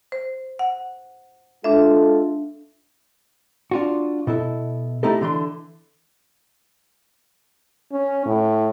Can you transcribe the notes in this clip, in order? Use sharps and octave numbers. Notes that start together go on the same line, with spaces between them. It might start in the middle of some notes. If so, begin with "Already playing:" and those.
C5
F#5
G#3 D4 F4 A4 E5
D4 F4 F#4
B2 E4 A4
A3 D#4 E4 G4 A4
D3 E3 C6
C#4
A2